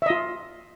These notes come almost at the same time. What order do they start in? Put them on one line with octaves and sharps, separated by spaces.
E5 D#5 F4